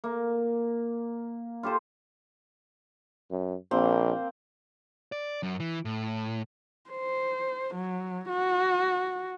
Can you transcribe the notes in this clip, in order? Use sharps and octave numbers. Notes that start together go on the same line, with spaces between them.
A#3
F4 G4 A4 C5
F#2
A#1 A#3 C4
D5
F#2
E3
A2
C5
F#3
F#4